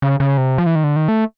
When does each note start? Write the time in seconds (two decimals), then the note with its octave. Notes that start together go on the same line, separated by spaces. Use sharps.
0.02 C#3
0.20 C#3
0.38 C3
0.58 F3
0.66 E3
0.75 D#3
0.84 D3
0.96 D#3
1.08 A3